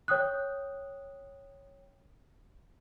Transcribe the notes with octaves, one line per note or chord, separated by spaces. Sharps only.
C#5 G5 D#6 F#6